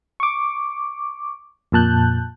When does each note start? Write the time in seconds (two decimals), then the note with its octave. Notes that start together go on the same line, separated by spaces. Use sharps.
0.20 C#6 D6
1.72 F2 A#2 A5 F#6 G6